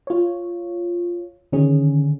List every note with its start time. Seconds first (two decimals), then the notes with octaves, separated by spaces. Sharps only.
0.07 F4 C#5
1.52 D3 D#3 C#4 G#4